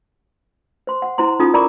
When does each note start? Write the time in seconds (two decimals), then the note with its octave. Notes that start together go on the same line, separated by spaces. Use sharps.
0.87 C5 C6
1.02 F#5
1.18 E4 C5 A#5 C6
1.39 C#4 D#4 F4 A4 A#5 D#6
1.53 A#4 D5 A#5 B5 C#6 D6